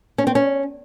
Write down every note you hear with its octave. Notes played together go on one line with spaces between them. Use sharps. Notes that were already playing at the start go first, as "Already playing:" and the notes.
C#4
C4
C#4